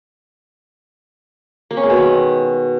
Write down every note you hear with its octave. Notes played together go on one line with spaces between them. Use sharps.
A#3
C#4
G#3
B2
D#3